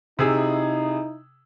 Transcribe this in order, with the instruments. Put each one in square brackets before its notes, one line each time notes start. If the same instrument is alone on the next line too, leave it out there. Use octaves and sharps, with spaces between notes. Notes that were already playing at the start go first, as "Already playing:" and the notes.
[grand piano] C3 G#4 E6 [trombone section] D#4 E4